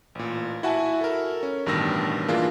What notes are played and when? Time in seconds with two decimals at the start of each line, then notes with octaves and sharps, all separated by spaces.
0.15 A1 A#2
0.63 E4 F#4 E5 F#5 G#5 A5
1.01 A4 A#4
1.43 C#4
1.66 A1 G2 B2 D#3 E6 A#6
2.28 E3 A#3 D4 F4 G#4 A#4